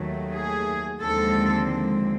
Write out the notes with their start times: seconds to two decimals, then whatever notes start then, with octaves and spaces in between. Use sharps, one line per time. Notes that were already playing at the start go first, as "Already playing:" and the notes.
Already playing: D#2 D#3 F#3 A3
0.34 G#4
1.02 D#2 D3 F3 G#3 C4 A4